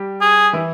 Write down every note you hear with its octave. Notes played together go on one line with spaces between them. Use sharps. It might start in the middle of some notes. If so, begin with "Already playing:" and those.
Already playing: G3 G4
G#4
E3 E4